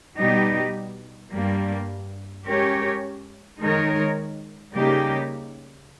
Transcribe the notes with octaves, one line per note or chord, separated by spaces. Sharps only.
B2 G3 B3 D#4 G4
G2 G3 A#3
G#3 C#4 G4 A#4 C#5
D#3 G#3 D#4 A#4 C#5
C#3 G3 A#3 D#4 G4